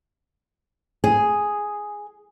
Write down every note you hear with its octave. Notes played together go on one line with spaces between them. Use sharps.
G#4